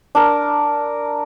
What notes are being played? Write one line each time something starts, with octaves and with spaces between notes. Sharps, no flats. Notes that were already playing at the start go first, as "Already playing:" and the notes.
D4 A#4